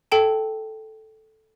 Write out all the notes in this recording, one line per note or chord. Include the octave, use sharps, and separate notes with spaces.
A4 G5 A5